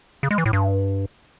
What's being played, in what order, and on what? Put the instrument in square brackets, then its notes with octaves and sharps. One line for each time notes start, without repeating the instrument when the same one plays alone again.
[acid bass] C#3
G#3
E3
A2
G2